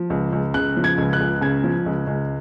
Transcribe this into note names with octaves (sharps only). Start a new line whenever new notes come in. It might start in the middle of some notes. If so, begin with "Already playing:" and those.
Already playing: F3
C#2
C#2
C#3 F#6
F3
G#6
C#2
F#6
C#2
C#3 G#6
F3
C#2
C#2